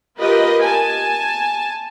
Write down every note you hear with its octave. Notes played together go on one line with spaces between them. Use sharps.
F4 G4 A#4 B4 D#5
G#5 A5